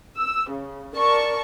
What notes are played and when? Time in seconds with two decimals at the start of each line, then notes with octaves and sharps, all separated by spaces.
0.16 E6
0.51 C#3
0.97 A#4 D5 A5 C#6